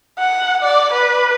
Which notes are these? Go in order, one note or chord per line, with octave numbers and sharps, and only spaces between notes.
F#5
D5
B4